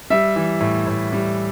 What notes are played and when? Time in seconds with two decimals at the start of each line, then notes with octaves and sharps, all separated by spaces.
0.10 G3 E5
0.36 E3
0.60 A2
0.87 A2
1.12 G3